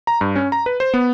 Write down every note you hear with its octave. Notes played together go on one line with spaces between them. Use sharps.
A#5
G2
C#4
A#5
B4
C5
B3